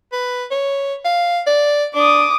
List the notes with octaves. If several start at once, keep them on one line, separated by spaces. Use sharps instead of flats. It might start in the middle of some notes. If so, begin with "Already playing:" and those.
B4
C#5
F5
D5
D4 D6 D#6